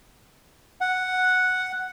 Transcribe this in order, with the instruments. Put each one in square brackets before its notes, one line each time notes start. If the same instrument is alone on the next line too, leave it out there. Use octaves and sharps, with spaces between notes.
[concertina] F#5